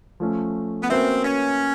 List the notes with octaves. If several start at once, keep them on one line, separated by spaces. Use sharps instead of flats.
F3 A3 C#4
B3
A#3 C4 C#4 F#4 B4 E5
C#4